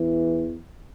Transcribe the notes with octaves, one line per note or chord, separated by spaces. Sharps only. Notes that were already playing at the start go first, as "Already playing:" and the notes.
Already playing: E2 E3